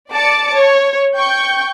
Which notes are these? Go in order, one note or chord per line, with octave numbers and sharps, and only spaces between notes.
D5 A5 D6 C#7
C#5
G5 C#6 G6